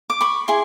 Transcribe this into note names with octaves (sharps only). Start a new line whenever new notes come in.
D6
B5 C#6
E4 G#4 C6